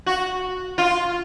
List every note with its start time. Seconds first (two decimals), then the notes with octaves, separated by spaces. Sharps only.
0.06 F#4
0.78 F4